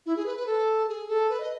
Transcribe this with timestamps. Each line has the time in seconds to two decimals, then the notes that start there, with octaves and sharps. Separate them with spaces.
0.06 E4
0.16 G#4
0.26 B4
0.37 B4
0.46 A4
0.89 G#4
1.09 A4
1.30 B4
1.40 D#5